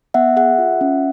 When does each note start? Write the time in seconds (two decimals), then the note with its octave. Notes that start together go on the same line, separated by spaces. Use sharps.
0.14 B3 E5 F#5
0.36 G#4 E5 F#5
0.59 F4
0.81 C#4